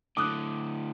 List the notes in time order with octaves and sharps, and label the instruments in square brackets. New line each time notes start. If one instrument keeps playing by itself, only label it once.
[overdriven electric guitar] A2 D3 [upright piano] D6 D#6 F#6